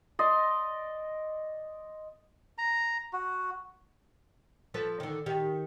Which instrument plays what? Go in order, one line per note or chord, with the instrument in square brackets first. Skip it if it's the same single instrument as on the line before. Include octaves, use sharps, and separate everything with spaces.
[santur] D5 D#5 C6
[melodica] A#5
F#4
[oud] F3 A4 B4
D3 D#3
D#3 G4